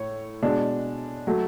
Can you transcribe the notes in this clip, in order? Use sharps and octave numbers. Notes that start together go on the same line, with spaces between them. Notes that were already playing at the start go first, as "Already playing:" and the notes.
Already playing: A2 C#5
B2 G#3 D4
F#3 A3